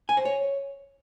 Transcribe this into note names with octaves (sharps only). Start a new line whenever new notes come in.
G#5
C5
C#5